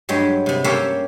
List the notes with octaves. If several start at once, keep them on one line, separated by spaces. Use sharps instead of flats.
G2 F#3 G#3 G4
C3 B3
A#3 C#4 G4 A4 A#4 C5